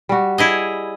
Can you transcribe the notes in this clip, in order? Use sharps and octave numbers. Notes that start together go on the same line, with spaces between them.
G3 F#4
E4 G#4 D#5